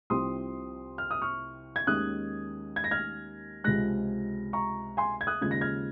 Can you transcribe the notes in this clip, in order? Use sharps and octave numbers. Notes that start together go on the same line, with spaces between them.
C2 C3 F3 C4 C6 D#6
F6
D#6
C#6 F6
G#6
D#2 D#3 G#3 C#4 D#6 F#6
G#6
A#6
F6 G#6
C#2 C3 F3 G#3 F#6 A#6
A#5 C#6
G#5 C6
G#6
D#6 F#6
D#2 C#3 F3 G#3 C#4 G#6
A#6
F6 G#6